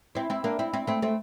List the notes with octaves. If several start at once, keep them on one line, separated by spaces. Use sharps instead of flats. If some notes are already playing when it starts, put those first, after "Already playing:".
C4 E4
C4 E4
A#3 D4
C4 E4
C4 E4
A3 C4
A3 C4